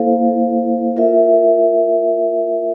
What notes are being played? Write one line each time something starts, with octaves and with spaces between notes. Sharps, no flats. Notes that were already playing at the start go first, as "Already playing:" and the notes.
Already playing: A#3 E4 A4 C5 F5
F4 A#4 E5